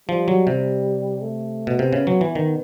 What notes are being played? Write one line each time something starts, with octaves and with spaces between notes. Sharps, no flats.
F3 G3
F#3
C3
A3
B2
C3 B3
C#3
F#3
E3
D#3